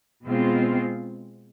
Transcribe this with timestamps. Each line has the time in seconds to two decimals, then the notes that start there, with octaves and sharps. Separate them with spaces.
0.25 B2 G#3 C4 F4